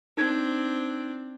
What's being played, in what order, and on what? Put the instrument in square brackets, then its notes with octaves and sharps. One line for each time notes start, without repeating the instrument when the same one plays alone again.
[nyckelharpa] C4 D4 [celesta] D#4 G#6